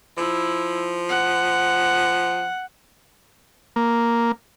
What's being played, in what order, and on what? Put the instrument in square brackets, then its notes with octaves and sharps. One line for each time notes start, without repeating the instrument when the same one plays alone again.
[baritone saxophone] F3 [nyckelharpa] E4
[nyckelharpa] F#5
[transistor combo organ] A#3